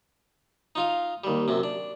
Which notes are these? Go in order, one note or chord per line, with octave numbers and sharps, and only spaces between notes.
D#4 F4 F5
D#2 G3
F#2 C3
D4